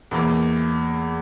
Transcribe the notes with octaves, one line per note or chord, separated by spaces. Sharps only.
E2 E3 A#3